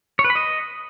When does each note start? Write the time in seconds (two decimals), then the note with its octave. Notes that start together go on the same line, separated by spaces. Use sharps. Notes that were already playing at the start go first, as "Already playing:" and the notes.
0.19 C#5
0.24 B4
0.30 B5
0.35 D#5